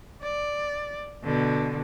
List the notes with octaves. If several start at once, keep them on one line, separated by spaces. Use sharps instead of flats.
D5
B2 D3